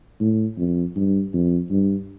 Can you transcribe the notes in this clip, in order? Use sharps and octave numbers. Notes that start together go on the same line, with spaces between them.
A2
F2
G2
F2
G2